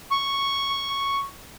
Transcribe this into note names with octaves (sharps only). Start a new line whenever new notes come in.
C#6